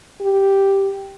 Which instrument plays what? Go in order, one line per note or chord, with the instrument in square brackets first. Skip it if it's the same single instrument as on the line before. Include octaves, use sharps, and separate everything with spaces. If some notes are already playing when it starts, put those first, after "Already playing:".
[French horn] G4